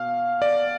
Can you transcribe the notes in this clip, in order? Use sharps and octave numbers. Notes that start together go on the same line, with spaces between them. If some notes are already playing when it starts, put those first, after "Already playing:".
Already playing: B2 F5
D5